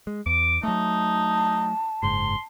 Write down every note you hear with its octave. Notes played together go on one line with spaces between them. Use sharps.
G#3
E2 D6
F#3 A3 D#4 A5
F#1 G#2 C6